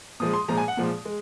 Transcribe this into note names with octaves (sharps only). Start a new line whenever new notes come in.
A#2 F3 G#3 D#6
C6
A#2 F3 G#3 A#5
G#5
F#5
A#2 F3 G#3
G#3